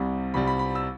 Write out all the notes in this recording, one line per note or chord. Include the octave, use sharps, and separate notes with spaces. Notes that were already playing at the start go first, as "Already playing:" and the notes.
Already playing: C2 C3 G3
C2 C3 G3 B5
B5
B5
E6